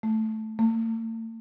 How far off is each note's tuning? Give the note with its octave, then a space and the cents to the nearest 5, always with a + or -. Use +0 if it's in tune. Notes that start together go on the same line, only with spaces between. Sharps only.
A3 -5
A3 +45